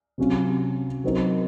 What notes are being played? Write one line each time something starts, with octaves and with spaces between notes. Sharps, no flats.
C3 F#3 C#4 F4
F#3 C4 D#4 A#4